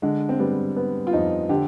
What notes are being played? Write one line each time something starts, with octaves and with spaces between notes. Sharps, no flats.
D3 G#3
C4
G3 B3
B3
F4
F2 D#4
D3 G4